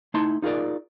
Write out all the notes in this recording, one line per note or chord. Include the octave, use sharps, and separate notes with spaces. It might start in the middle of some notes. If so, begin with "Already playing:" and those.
A3 D#4 E4 A5 C6
D#4 F4 G#4 A#4 D5